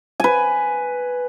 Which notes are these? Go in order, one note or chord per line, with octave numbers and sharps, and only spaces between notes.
B4 G#5